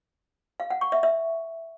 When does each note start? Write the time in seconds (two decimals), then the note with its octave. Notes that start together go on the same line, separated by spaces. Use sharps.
0.60 F5
0.70 F#5
0.81 C#6
0.92 E5
1.03 E5